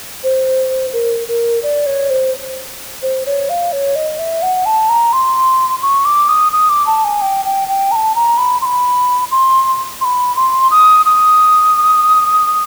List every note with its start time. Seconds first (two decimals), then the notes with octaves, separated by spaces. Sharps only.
0.24 C5
0.93 A#4
1.28 A#4
1.63 D5
1.86 C#5
2.10 C5
3.02 C5
3.26 C#5
3.49 F5
3.72 C#5
3.95 D#5
4.19 E5
4.42 F#5
4.65 A5
4.89 A#5
5.12 C6
5.82 C#6
6.05 D6
6.29 D#6
6.52 D#6
6.69 D6
6.86 A5
7.04 G#5
7.21 G5
7.45 G5
7.68 G5
7.91 A#5
7.95 A5
8.15 A#5
8.38 B5
8.61 C6
8.65 B5
9.31 C6
10.01 C6
10.04 B5
10.36 C6
10.71 D#6
11.06 D#6